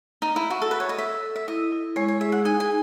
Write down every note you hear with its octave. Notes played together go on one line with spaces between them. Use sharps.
D#4
E4
F#4 E5
A4
B4
A4
C#5
D#5
A4 E5
A4
E5
E4 D#5
E4
G#3 C#5
C#5
G#4 E5
F#5
D#4 G#5
G#5